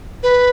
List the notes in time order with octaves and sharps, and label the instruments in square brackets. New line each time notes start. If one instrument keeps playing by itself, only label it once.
[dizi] B4